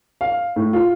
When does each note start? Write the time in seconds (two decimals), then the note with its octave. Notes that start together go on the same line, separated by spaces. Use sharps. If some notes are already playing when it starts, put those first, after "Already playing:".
0.21 F5
0.56 A2
0.73 F4